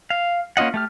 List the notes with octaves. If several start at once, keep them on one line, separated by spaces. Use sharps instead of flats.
F5
A#3 C#4 F4 D#5 F#5
A3 G4 F6